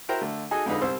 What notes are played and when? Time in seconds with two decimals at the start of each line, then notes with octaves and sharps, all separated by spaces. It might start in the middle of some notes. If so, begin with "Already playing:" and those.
0.09 E4 F#4 A#4 C5 G5 A#5
0.21 D3 A3
0.51 D#4 F#4 G#4 A4 D#5 G#5
0.66 F2 D3 G#3 D#4 B4
0.81 C2 C4 C5 E6